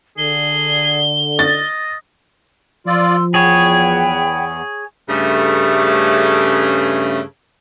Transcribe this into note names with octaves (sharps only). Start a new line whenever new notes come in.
D3 G#4 G7
D#5 A6
F3 F4 D5 C6 E6
E2 G#4 C#5 F#5 G5 B5
G2 C#3 A3